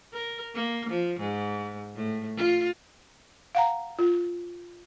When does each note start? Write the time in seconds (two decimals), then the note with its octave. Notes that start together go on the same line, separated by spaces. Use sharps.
0.14 A#4
0.55 A#3
0.90 F3
1.20 G#2
1.96 A2
2.37 F4
3.55 F5 F#5 A#5
3.99 F4